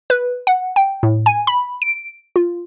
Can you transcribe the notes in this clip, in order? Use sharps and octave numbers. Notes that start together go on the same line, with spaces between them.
B4
F#5
G5
A2
G#5
B5
D7
F4